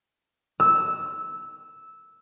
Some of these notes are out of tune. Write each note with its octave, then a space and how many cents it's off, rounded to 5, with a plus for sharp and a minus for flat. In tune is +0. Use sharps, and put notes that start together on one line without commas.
E6 -10